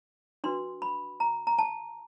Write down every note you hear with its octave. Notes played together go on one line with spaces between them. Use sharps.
D4 F#4 B4 C6
B5
A#5
A#5
A5